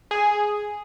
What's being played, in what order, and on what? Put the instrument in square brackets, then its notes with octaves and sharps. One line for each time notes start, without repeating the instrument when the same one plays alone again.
[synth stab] G#4